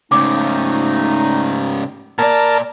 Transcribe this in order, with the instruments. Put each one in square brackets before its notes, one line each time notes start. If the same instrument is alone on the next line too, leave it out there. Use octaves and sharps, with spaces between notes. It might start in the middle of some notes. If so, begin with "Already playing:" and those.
[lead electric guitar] G#2 C#3 [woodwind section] A3 D#4 [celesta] D6
[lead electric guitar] A#2 D5 [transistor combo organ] A#4 A5